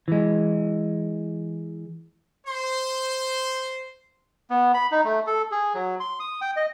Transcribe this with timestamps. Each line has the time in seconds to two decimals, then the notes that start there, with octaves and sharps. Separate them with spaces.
0.08 E3 G#3
2.47 C5 C6
4.50 B3
4.74 B5
4.92 D#4
5.05 A3
5.27 A4
5.52 G#4
5.74 F#3
6.00 C6
6.20 D#6
6.41 G5
6.56 D#5